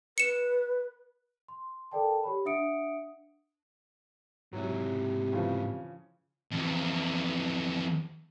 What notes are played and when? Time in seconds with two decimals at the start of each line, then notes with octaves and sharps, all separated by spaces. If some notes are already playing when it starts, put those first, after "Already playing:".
0.18 B4 C#7 E7
1.48 C6
1.92 A4 A#4 D5 G5 A5
2.24 G4 C#5 B5
2.45 D4 E5 F#5 D#6 C#7 D7
4.53 G#2 C3 F#3 E4
5.33 C#3 E3 F3
6.51 F2 E3